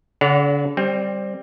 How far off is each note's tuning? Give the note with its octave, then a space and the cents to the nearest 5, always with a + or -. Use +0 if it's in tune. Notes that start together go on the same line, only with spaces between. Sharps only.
D3 -40 C#5 +45 F#5 +0
G3 +0 C4 +15